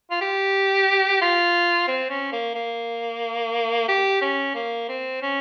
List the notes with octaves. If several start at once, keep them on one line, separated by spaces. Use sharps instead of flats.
F4
G4
F4
C4
C#4
A#3
A#3
G4
C#4
A#3
C4
C#4